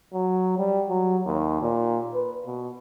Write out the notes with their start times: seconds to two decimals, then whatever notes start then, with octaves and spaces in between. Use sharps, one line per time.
0.14 F#3
0.58 G3
0.89 F#3
1.26 D#2
1.62 A#2
2.14 B4
2.46 B2